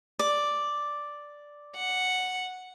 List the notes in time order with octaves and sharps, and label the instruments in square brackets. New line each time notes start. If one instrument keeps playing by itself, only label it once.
[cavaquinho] D5
[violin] F#5